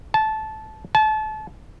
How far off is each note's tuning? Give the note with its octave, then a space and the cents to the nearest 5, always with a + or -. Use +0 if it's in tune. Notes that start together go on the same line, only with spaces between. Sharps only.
A5 -15
A5 -30